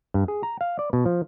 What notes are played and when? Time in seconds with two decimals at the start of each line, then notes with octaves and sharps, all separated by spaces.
0.14 G2
0.28 G#4
0.43 A#5
0.61 F5
0.79 D5
0.93 B2
1.06 F3